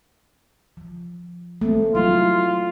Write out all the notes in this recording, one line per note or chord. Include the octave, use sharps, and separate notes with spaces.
F3
A3 A#3 C4
F#3 G3 E4 F4